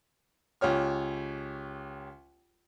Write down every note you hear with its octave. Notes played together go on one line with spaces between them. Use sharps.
C#2 G4 C#5 F6